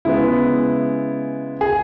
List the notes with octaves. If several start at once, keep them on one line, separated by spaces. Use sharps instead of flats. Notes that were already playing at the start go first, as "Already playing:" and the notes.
C#3 G#3 B3 E4
G#4